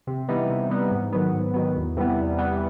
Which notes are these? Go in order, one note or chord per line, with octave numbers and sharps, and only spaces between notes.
C3
E3 G3 B3 D#4
C3
E3 G3 B3 D#4
G#2
D#3 F#3 B3
G#2
D#3 F#3 B3
E2
C3 E3 G3 B3
E2
C3 E3 G3 B3